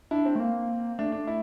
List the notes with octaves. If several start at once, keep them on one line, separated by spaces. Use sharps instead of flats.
D4 E4
C4
A3
A#3
A3 D4
D4
E4